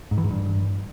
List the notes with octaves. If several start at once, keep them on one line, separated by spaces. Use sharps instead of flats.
G#2
E3
G#2
G2